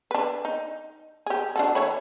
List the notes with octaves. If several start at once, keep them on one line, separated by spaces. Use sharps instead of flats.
D4 B4
D#4
G4 G#4
D4 F#4 A4
E3 C#5 B5